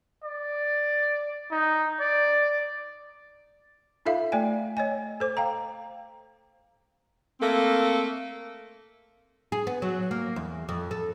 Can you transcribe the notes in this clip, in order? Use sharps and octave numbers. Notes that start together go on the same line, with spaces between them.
D5
D#4
D5
D#4 F4 A4 E5 F5
A3 D5 G5 G#5
C#5 D#5 G#5
A4 C5 D6
F5 G5 A#5
A3 A#3 C4 A4
G#4
B3
F#3
A#3
E2
F2
A4